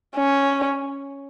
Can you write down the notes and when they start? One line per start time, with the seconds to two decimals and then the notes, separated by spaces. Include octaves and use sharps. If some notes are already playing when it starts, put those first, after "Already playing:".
0.17 C#4